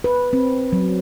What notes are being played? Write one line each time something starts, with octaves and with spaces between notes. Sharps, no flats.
B4
C4
F#3